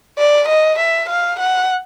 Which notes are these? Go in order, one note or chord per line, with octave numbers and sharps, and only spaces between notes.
D5
D#5
E5
F5
F#5